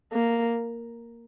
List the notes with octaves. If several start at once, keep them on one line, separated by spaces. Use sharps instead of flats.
A#3